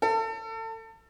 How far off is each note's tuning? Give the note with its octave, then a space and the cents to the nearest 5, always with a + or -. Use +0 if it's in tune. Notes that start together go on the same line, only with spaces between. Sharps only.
A4 +30